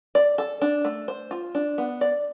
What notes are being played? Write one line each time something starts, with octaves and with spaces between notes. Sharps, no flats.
D5
A4
D4
A3
C5
F4
D4
B3
D5